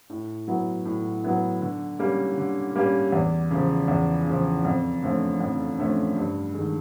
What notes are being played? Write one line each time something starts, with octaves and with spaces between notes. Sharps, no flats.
A2
F#3 B3 E4
A2
F#3 B3 E4
D3
G3 A#3 C#4
D3
G3 A#3 C#4
E2
C#3 F3
E2
C#3 F3
F2
D3 F3 A3 C#4
F2
D3 F3 A3 C#4
G2
D#3 G#3